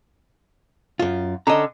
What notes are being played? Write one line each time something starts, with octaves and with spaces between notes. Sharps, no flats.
F#2 F4
D3 C#4 A4 D#5 A#5